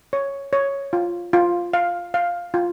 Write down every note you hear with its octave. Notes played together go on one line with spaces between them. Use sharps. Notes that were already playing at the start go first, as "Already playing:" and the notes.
C#5
C#5
F4
F4
F5
F5
F4